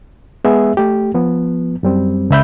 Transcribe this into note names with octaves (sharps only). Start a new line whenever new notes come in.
G#3 B3 G#4 E5
A3 G4
F3 B3
F#2 G3 C4
C#2 C#3 E5 B5 G6